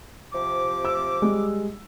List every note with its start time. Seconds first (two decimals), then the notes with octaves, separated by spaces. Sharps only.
0.33 C3 F3 D6
0.85 E6
1.22 G3 G#3